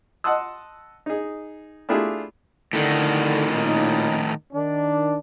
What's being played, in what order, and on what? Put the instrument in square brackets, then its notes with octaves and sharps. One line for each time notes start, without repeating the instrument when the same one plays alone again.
[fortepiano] D#5 F#5 A5 C6 D#6 E6
D#4 G#4
A3 D4 E4 F4 G4 G#4
[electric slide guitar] A2 D#3 [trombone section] D3
[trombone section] A#2 C#4 D#4
D#3 D4